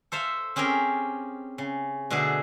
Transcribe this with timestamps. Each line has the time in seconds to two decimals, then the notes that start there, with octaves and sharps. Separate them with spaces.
0.12 A4 C5 E5 F5
0.56 C4 C#4 G4 G#4 A#4
1.58 C#3
2.10 B2 D3 A3 D4 G#4